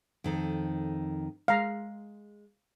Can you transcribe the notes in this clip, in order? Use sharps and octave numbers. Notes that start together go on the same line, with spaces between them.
F2 D#3 A4
G#3 F5 A#5